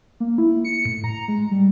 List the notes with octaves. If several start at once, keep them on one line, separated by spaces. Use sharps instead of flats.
A#3
E4
C#7
A2
A#5
G#3
G3